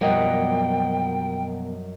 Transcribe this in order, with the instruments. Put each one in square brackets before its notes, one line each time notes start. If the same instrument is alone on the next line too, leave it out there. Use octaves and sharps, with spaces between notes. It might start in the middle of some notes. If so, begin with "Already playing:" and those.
[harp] F#2 D#5 [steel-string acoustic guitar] B2 A#3 [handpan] F3 G3 F#5 [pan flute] G5